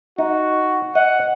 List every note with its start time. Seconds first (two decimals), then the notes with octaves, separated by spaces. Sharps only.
0.18 D#4 F#4
0.95 D#5 F#5